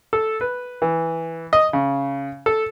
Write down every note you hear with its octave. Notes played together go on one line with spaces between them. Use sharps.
A4
B4
E3
D#5
C#3
A4